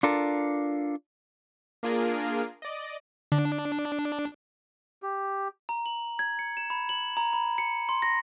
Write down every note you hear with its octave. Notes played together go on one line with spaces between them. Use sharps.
D4 F4 A4 A#4
A#3 D4 F4 G#4 A#4
D5 D#5
D3 D4
G4
A#5
F#7
G#6
C#7
E7
B5
F#7
A#5
B5
C#7
C6
A#6